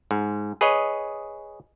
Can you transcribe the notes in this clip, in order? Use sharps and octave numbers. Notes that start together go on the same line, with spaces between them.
G#2
G#4 B4 C#5 D#5